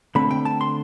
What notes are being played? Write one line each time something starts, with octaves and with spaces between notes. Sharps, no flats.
D3 A3 C4 B5
G5
A5
C6